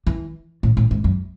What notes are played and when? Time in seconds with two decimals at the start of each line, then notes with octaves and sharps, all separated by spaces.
0.07 E3
0.63 A2
0.77 A2
0.91 G#2
1.04 F#2